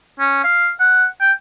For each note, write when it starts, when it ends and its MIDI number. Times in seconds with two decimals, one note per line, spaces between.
0.20 0.39 61
0.44 0.69 77
0.80 1.06 78
1.21 1.32 79